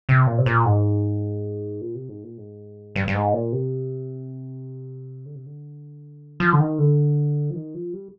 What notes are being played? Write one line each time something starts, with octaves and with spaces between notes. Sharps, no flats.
C3
A#2
C3
A#2
G#2
A#2
C3
G#2
A#2
G#2
G2
G2
G#2
A#2
C3
D3
C3
D3
F3
D3
D#3
D3
F3
D#3
F3
G3